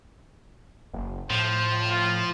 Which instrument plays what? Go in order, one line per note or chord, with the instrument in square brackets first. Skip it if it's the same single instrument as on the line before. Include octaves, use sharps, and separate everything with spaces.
[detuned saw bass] F#1
[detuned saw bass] A2 [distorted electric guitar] F3 [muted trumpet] C5
[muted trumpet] F4